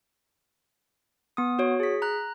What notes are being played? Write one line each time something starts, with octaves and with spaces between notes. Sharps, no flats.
B3 D#6
F#4 C#5
G#4 B6
A#5 F#6